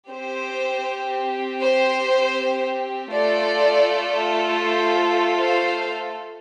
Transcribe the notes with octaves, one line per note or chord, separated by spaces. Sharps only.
C4 G4 C5
C5
A3 F4 A4 D5
C5
C5 F5